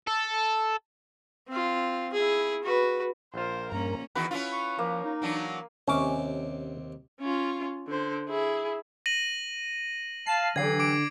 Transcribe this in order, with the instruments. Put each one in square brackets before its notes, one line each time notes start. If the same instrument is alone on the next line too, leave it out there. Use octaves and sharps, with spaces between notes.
[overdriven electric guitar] A4
[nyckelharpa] C4 F4
E4 G#4
F#4 B4
[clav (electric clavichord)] A#1 F4 [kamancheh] A#4 C5
[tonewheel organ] G2 A#4 [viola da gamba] A#3 C#4 [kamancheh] A#5
[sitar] E2 D#3 F#4 [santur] B4
[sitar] C#4 E4 F4
[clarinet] C#6
[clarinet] F3 [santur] A#3
[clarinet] D#4
[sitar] E3 F#3 D4
[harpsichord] D#2 C3 D6 [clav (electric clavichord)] C#4
[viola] C#4 F4
D3 C5
E4 G#4
[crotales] A#6 D#7 F#7
[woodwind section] F5 A5 [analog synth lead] C7
[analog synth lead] D3 [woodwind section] E3 F#3 G4 [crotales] G#6 C7
[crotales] D6 D7